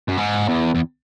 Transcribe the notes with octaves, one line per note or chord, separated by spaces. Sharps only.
F#2
G#2
E2
E2